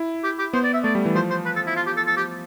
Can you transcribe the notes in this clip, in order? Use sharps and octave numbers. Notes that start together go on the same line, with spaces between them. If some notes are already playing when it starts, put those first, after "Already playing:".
Already playing: E4
G4
G4
B3 C5
D5
E5
A3 D5
G3
E3
F3 C5
C5
B4
A4
E4
F4
G4
A4
A4
G4